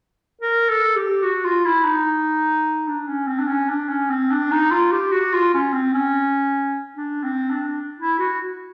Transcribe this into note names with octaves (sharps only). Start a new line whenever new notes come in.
A#4
A4
G4
F#4
F4
E4
D#4
D4
C#4
C4
D4
C#4
D4
C#4
C4
D4
D#4
F4
G4
F#4
F4
C#4
C4
C#4
D4
C4
D4
E4
F#4